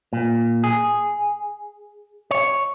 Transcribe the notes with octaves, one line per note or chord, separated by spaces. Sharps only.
A#2
G#4
C#5